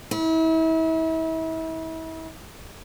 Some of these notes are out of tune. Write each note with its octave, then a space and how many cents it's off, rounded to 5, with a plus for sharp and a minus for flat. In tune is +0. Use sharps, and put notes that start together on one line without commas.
E4 -35